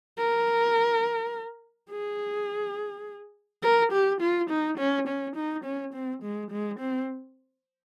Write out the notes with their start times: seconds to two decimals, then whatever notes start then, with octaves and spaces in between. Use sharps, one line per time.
0.18 A#4
1.90 G#4
3.63 A#4
3.92 G4
4.21 F4
4.50 D#4
4.79 C#4
5.08 C#4
5.36 D#4
5.64 C#4
5.94 C4
6.23 G#3
6.51 G#3
6.80 C4